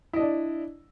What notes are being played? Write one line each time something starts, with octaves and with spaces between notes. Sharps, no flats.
D4 E4 D5 D#5